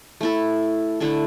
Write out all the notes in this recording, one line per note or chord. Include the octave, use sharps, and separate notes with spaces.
A3 E4 A4
D3 A3 E4 A4